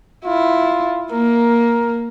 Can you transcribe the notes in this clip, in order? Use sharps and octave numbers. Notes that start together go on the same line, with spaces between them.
E4 F4
A#3 A#4